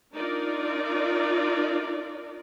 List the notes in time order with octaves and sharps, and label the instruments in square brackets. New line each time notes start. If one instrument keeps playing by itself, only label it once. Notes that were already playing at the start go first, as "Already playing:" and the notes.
[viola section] D4 D#4 F4 A#4 D5